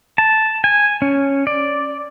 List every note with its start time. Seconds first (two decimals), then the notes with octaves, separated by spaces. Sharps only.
0.18 A5
0.64 G#5
1.02 C#4
1.47 D5